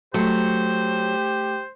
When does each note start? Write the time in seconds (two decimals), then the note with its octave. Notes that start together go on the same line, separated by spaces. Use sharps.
0.14 F#3 A3 G4 C5 C6